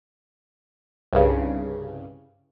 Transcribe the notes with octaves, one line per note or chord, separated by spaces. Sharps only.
C2 G2 C#3